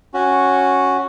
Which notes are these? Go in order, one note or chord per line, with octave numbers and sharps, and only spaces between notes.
C#4 F#4